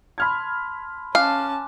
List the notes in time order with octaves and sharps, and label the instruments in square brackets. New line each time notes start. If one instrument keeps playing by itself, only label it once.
[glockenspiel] A5 C6 [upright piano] B5 F6 G#6
[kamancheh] C#4 A5 [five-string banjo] F5 [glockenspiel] G#5 D6 F#6